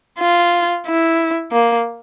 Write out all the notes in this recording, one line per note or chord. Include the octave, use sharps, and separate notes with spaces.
F4
E4
A#3